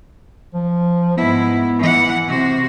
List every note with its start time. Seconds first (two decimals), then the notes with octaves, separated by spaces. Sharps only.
0.54 F3
1.17 G#2 B3 E4
1.79 E3 F#5
2.27 C3 F#4